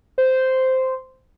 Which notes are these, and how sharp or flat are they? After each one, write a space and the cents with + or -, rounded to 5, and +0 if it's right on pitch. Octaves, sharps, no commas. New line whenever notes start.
C5 -10